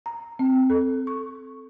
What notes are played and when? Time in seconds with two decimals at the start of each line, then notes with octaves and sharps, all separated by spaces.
0.06 A#5
0.39 C4
0.70 A4
1.07 C#6